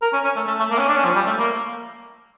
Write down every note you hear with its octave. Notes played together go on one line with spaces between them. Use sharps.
A#4
C#4
C#4
A3
A3
A3
A#3
C#4
D4
C#4
F3
G3
A3
A#3